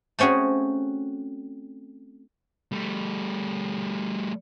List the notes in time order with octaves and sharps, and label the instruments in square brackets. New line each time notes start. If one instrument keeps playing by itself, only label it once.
[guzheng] A3 C4 C#4 F#4 G#4
[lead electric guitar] G3 A3